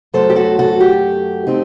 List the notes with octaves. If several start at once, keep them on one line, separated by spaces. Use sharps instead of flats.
F#2 F#3 A3 A4 C5
G4
F#4 A4
F#4 A4
G4
A3 C4 D#4